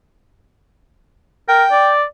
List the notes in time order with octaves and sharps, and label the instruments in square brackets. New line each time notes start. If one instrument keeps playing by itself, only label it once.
[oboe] A#4 [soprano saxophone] G5
[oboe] D5